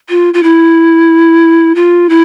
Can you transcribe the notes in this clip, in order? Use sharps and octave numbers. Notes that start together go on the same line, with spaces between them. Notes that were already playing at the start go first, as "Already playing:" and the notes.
F4
F4
E4
F4
E4